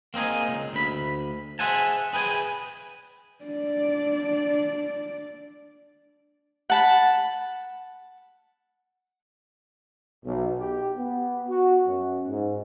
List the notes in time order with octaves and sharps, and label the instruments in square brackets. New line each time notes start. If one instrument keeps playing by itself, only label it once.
[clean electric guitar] A#3 C4 D#4 G#4
C#2
D2 B5
G#4 C5 E5 F#5 G#5 A5
G#4 B4 G5 G#5
[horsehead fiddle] D4 D5
[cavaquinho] F#5 A5 B5
[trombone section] B1
G4
B3
F#4
F#2
G#2